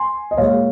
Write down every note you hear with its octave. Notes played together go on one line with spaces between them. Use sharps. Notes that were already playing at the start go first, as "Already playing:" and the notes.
Already playing: G#5 C6
D#5
A#2 G#3 C#5 F5